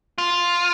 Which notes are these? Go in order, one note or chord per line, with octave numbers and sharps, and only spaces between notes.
F4